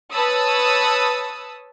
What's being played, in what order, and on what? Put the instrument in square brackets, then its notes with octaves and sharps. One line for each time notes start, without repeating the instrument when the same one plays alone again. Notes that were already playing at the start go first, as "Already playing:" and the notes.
[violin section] B4 C#5 A5 B5 D#6 E6